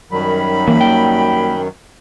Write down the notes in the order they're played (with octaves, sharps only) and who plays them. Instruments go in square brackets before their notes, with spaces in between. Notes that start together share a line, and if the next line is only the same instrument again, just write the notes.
[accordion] F#2 D#3 F#3 [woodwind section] G3 B5
[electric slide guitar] E3 [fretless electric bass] A#3
[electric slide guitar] G5